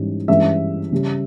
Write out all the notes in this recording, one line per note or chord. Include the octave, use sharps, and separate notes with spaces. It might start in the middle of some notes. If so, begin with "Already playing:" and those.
Already playing: G#2 E3 G3 C#4
G2 E3 G#3 C#4 E5
C#3 G3 C#4